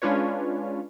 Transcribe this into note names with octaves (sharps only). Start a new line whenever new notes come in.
G#3 C#4 D4 F4 B4 C#5